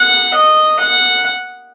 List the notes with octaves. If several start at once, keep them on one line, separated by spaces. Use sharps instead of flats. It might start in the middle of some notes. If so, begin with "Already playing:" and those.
Already playing: F#5
D#5
F#5